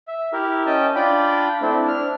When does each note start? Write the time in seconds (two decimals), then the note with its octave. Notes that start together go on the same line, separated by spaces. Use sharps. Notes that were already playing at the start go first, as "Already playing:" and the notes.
0.08 E5
0.33 E4 G4 A#4
0.66 C#4 D#5 G5 A5
0.95 D4 F4 D5 G5 B5
1.61 A3 C4 D4 E4
1.88 D4 F6